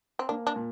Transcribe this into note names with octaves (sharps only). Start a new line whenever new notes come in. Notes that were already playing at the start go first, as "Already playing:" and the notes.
C4
A#3 D4
D4
A#2